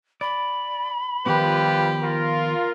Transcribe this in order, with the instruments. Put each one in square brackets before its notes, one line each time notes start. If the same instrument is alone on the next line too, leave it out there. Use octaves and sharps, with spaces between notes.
[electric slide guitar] D5 [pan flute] B5
[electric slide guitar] D#3 F3 B3 [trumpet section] G3 F4 B4 [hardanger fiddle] G4
[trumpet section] F4 A#4